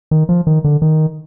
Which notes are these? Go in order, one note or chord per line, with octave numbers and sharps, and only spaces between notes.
D#3
F3
D#3
D3
D#3